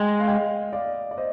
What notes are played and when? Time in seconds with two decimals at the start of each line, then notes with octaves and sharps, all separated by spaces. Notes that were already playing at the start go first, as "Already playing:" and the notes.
Already playing: G#3 D#5 G5
0.20 F5
0.27 D#5 G5
0.73 D5 F5
1.11 D5
1.18 C5 D#5